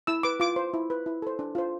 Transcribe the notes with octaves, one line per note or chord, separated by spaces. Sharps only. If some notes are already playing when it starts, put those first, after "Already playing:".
E4 E6
B4 D6
F4 D6
C5
E4
B4
E4
A4 C5
D4
F4 C5